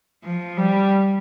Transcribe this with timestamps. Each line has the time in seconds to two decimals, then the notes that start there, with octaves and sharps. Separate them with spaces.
0.23 F3
0.57 G3